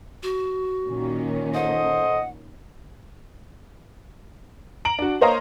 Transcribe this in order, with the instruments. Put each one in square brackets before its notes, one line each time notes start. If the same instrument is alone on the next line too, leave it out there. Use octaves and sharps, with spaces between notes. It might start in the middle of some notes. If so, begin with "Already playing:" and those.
[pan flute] F#4
[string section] A#2 D#3 C#4
[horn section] A4 C5 D#5 [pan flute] F#5
[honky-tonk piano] A#5 D7 F#7
D4 F#4
A#3 C5 C#5 D#5 F5 A#5